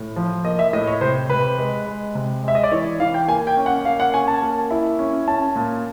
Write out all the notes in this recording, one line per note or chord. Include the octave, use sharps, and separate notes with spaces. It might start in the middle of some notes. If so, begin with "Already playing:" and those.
Already playing: A2
F3
A#3 D#5
E5
A2 D#5
C#5
C3 C5
C3 B4
G#3
G#3
C3
G#3 E5
D#5
D5
E3 C#5
E3 F5
G5
A#3 G#5
G5
C#4
F#5
A#3 F5
F#5
C#4 G#5
A5
A#3
E4
C#4
C#4 A5
A#2